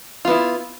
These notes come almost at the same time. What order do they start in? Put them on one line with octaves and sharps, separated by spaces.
F4 B3 E4